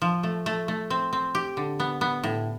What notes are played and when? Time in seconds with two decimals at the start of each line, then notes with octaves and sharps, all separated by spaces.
0.02 F3
0.23 A3
0.46 A3
0.68 A3
0.90 C4
1.13 C4
1.35 G4
1.57 D3
1.80 B3
2.01 B3
2.24 A2